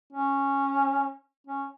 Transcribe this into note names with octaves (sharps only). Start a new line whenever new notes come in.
C#4
C#4